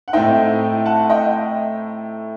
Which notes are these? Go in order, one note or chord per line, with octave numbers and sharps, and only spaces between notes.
F#5
A2 A3 C4 D#4 D#5 G5
F#5 A5
F#5
D#5 G5